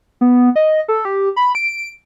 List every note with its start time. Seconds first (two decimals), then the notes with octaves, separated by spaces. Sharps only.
0.21 B3
0.56 D#5
0.88 A4
1.05 G4
1.36 B5
1.55 D7